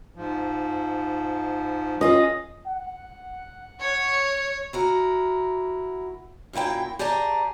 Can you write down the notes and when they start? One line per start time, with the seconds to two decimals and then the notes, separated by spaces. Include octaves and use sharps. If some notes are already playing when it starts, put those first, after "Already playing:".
0.16 G#2 F3
2.01 C#4 F4 G#4 D#5
2.67 F#5
3.81 C#5
4.73 E4 F#4 A#4
6.53 F#2 A#2 A#3 E4 G5
6.99 G4 G#4 D5 A5 A#5